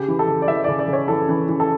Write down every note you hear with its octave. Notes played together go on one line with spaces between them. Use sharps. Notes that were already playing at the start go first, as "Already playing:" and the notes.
Already playing: C#3 G4
E3
A4
C#3
D5
E3 E5
C#3 D5
D5
C#3
C#5
E3 A4
E3
E3
A4